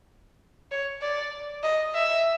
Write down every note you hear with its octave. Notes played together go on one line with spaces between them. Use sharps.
C#5
D5
D#5
E5